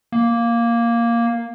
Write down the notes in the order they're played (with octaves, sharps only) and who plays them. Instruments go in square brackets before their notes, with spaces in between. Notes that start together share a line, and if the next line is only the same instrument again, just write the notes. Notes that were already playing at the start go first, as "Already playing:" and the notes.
[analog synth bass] A#3